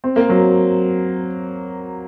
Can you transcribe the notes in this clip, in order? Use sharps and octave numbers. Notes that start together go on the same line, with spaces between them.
C4
A#3
F#3